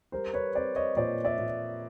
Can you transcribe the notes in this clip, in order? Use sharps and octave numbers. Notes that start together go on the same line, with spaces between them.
G3 A#4 C5
B4 C#5
C4 C5 D5
C#5 D#5
A#2 C5 D5
D5 E5
A#2